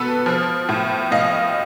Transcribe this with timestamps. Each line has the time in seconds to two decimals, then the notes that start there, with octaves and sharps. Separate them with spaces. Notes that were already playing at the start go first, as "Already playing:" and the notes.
Already playing: B2 B3 A4 B4
0.26 F3
0.69 A2
1.11 A2 D#5 F5